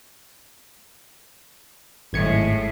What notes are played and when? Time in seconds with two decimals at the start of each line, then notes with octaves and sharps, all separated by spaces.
2.13 G#1 A2 G#3 G#6 C#7